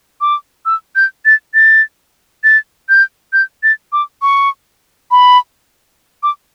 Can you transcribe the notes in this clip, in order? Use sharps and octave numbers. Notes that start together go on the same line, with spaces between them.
D6
E6
G6
A6
A6
A6
G6
G6
A6
D6
C#6
B5
D6